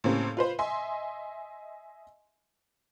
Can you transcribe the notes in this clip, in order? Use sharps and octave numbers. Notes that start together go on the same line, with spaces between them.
A2 C#3 A#3 C4 C#4 G4
F4 B4 C5
D#5 E5 G#5 C6